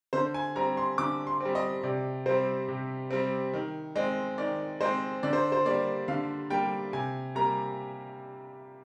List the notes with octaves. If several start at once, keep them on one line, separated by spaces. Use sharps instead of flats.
D3 C5
G#5
G3 C4 A#5
C6
D3 D6
C6
G3 C4
D#5
C3 D5
G3 C4 C5
C3
G3 C4
D#3
G#3 C4
D#3 D5
G#3 C4 C5
D3 D5
C5
C5
G3 A#3 D5
D3 F5
G3 A#3 G5
C3 G#5
G3 A#3 A#5